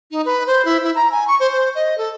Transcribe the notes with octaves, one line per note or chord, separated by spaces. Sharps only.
D#4
B4
C5
E4
E4
A#5
G#5
C#6
C5
C5
D#5
A4